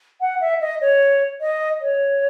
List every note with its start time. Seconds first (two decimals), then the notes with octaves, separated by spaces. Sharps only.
0.21 F#5
0.41 E5
0.61 D#5
0.81 C#5
1.41 D#5
1.81 C#5